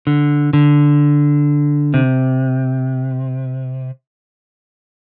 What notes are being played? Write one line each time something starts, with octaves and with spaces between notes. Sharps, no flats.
D3
D3
C3